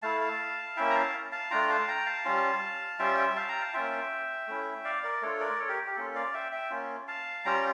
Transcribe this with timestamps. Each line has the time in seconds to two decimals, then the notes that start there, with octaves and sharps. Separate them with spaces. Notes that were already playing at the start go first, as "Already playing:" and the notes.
0.02 A3 E4 F5 A5
0.21 F5 A5
0.77 A#3 C#4 E4 E5 G5
0.90 A#5
0.95 F5 A5
1.32 F5 A5
1.51 A3 D4 F4 G5 A#5
1.69 F5 A5
1.88 G5 A#5
2.06 F5 A5
2.25 G3 C#4 F4
2.99 G3 C#4 F4 E5 G5
3.18 E5 G5
3.36 F5 A5
3.49 G5 A#5
3.61 F5 A5
3.74 A#3 C#4 F4 E5 G5
4.47 A3 C#4 E4
4.84 D5 F5
5.03 A#4 D5
5.22 A3 D4 F4 A4 C#5
5.40 A#4 D5
5.59 A4 C#5
5.69 G4 A#4
5.87 G4
5.96 A#3 C#4 F4 A4
6.15 D5 F5
6.34 E5 G5
6.52 E5 G5
6.70 A#3 C#4 F4
7.08 F5 A5
7.45 G3 C#4 F4 G5 A#5